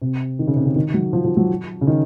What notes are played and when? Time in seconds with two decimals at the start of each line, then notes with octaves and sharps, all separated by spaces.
0.02 C3
0.39 D#3
0.47 C#3
0.56 C3
0.65 C#3
0.76 D#3
0.94 F#3
1.13 F3
1.25 F3
1.37 F#3
1.81 C#3
1.87 D#3